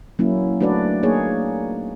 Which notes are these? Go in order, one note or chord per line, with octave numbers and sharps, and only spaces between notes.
F#3 A#3 C#4 E4
A3 D4 F#4 B4 D5
A#3 D#4 G#4 C#5